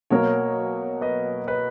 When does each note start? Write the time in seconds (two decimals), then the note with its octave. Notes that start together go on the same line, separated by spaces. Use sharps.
0.10 B2 F#3 A#3 A#4 C#5
1.01 B4 D#5
1.47 B4 D#5